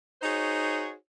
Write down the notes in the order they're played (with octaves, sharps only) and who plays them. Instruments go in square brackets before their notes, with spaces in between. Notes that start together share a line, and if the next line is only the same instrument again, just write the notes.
[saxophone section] D#4 F#4 G#4 C5 C#5